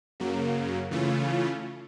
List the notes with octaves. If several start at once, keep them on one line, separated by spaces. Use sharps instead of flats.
F#2 C#3 F#3 A#3
C#3 E3 A3 C#4 F4